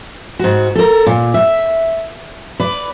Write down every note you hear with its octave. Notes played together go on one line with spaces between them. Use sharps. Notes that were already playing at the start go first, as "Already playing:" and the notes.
G#2 F#4
A4 A#4
A#2
E5
B4 D5